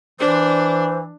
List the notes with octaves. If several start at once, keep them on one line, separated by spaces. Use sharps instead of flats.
E3 D4 C5